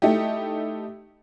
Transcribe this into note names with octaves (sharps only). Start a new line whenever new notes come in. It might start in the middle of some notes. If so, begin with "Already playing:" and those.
A3 D#4 E4 G4